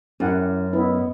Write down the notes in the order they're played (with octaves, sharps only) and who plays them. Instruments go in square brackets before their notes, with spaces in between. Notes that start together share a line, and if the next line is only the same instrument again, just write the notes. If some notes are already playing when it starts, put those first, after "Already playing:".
[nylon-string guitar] F#2 [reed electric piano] C#4 E4 [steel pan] G4 F#5
[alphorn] B3 [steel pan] E4 [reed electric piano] B4 D#5